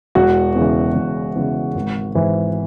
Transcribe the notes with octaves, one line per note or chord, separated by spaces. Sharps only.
E1 F#4
E2 C#3 E3
E1
E2 C#3 E3
G#1
G#2 E3